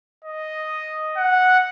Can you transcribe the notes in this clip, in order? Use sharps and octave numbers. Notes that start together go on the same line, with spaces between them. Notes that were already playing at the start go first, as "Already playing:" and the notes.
D#5
F#5